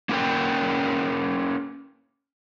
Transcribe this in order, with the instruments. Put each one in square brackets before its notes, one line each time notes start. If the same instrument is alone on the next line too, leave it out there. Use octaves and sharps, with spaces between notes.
[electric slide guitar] A#3 C#4 G4 A#4 B4 G5